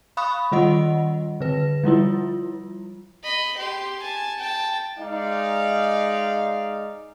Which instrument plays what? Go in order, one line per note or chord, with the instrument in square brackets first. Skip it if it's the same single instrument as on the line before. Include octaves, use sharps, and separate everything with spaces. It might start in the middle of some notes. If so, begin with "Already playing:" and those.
[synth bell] F5 B5 C#6 D#6 F#6
D#3 G3 F4 D#5 F#5
D3 B4
F3 G3 E4 F4
[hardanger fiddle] D#5 B5
G4 C6
G#5 A5
G5 A5
[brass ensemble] G#3 D#4 D5 F5